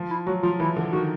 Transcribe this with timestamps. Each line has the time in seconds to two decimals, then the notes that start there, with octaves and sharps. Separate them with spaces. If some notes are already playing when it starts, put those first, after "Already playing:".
Already playing: F3
0.10 E4
0.27 F#3 F#4
0.43 F3 F4
0.59 E3 E4
0.76 D3
0.92 D#3 F#4